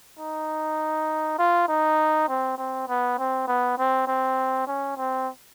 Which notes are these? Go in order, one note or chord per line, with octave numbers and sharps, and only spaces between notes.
D#4
F4
D#4
C4
C4
B3
C4
B3
C4
C4
C#4
C4